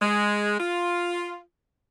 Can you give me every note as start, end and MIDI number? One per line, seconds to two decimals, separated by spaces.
0.02 0.59 56
0.60 1.40 65